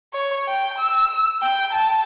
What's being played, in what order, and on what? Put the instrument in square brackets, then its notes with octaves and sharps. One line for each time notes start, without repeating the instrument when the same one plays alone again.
[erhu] C#5
G5
E6
G5
A5